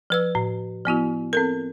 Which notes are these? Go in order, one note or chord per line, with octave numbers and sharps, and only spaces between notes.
F3 B4 E6
A2
F3 B3 E4 F#4
C4 A4 A#4